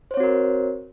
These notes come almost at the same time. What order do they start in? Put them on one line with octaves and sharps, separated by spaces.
C5 C#5 C4 F#4 A#4